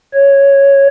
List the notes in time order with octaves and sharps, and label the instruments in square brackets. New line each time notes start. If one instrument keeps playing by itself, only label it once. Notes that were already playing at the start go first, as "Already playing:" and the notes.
[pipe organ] C#5